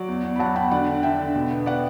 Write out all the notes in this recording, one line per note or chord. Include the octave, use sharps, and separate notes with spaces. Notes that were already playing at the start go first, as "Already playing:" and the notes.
Already playing: F#3 D5
E2
E2
B5
F#3 F#5 A5
E2 G5 B5
D3 D5 F#5
D3
D3 E5 G5
D3
B2
B3
B3 D5 F#5